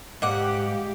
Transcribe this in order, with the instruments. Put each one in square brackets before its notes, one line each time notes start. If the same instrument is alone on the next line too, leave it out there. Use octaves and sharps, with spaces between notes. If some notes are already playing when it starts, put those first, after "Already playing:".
[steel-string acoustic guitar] G#2 F#5 [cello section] G#3 G4 [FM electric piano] D#5 F5 D6